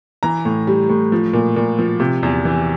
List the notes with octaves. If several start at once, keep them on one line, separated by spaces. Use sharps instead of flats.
E3 A#5
A2
G3
A2
F3
A#2
A#2
F3
C3
E2
E3